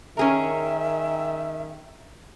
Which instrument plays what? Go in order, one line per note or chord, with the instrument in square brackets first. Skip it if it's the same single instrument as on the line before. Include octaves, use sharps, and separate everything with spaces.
[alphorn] D#3 [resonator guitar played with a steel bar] C#4 G#4 A#4 [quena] E5